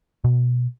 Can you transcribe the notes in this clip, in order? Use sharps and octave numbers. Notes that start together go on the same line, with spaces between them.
B2